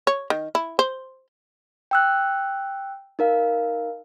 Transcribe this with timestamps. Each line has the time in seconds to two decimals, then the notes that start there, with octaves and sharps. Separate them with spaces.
0.07 C#5
0.30 D#3
0.55 E4
0.79 C5
1.91 G5 E6 F#6
3.19 D#4 A#4 F5